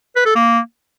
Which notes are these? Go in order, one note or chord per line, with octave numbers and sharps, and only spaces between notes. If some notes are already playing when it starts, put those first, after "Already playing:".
B4
A4
A#3